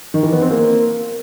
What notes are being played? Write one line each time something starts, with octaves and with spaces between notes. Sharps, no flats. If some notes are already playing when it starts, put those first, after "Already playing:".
D#3
E3
B3
C4
A#3